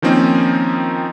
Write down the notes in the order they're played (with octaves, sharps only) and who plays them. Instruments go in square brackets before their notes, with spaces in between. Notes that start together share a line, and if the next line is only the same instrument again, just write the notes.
[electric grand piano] D#3 F3 A#3 C4 C#4 D#4